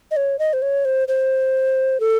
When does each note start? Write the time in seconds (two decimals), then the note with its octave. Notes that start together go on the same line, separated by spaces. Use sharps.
0.11 D#5
0.17 C#5
0.39 D#5
0.53 C5
0.62 C#5
0.85 C5
1.08 C5
2.00 A4